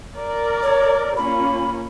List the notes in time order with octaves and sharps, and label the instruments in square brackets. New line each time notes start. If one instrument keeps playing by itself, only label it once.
[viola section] A#4 D5
[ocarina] C#5
[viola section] A#3 C#4 F4 [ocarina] B5